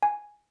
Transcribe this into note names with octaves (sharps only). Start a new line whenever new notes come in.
G#5